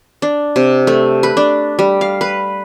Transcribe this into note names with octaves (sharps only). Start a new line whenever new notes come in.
D4
C3
A3
B4
D4
G3
F5
B4